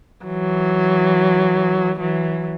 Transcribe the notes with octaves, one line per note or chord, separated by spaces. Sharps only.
E3 F#3
E3 F#3